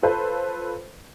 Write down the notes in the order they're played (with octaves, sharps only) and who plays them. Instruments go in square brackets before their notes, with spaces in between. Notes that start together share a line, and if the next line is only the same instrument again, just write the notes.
[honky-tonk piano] F4 A4 B4 C5